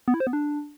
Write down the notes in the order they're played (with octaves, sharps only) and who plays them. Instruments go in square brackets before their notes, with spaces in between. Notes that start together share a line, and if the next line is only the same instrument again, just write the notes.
[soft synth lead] B3
E4
C5
B3
D4